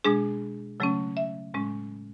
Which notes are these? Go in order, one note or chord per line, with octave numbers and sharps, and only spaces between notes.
B2 G#3 D4 G#4
C#3 F#3 A3 C#4
E5
A2 G#3 C#4